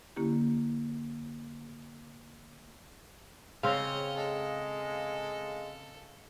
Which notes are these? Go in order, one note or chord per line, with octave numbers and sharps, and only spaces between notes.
D3 A#3 C#4 E4 G4
C#3 C4 C#5 D#5 F5
G#3 A4